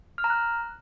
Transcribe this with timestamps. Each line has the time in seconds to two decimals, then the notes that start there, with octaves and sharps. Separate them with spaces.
0.18 F6
0.24 A#5
0.30 F#6